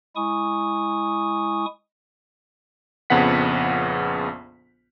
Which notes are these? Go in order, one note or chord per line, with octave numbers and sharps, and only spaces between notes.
G#3 E4 G#5 C#6 D#6
A#1 F2 C#3 B3 F#5 B6